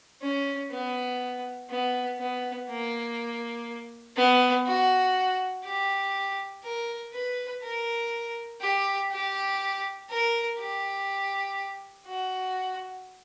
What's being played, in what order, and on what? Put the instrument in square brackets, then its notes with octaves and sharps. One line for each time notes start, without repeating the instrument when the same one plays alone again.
[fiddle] C#4
B3
B3
B3
A#3
B3
F#4
G4
A#4
B4
A#4
G4
G4
A#4
G4
F#4